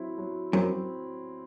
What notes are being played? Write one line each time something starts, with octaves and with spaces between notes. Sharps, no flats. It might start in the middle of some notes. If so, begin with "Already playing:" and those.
Already playing: F#3 C4 E4
F#3
F#2 C4